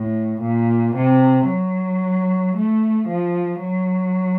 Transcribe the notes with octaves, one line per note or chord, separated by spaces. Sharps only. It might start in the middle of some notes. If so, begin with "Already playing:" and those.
Already playing: A2
A#2
C3
F#3
A3
F3
F#3